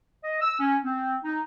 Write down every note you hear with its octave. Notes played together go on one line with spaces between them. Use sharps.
D#5
E6
C#4
C4
D#4